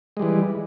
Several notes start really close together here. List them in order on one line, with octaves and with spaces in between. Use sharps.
G#3 G3 E3